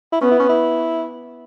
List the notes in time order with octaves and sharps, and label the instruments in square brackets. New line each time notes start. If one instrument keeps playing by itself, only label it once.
[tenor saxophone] E4
[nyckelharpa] B3 [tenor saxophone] C#4
[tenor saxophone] E4
C#4
E4